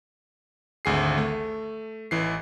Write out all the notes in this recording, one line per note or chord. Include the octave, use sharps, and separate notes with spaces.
G#1 D2 G#4 C7
A3
A1 E3 C7